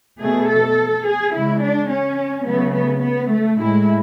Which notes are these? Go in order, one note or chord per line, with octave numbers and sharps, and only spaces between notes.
B2 A3 G#4
A4
G#4
C#3 G#3 E4
D4
C#4
C#3 F#3 A3 B3
B3
B3
A3
A2 G#3 E4